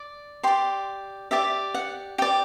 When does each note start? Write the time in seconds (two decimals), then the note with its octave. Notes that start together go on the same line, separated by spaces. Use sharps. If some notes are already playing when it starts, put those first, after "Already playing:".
Already playing: D5
0.43 G4 D5 C6
1.31 G4 D5 E5
1.74 F#5
2.18 G4 D5 G5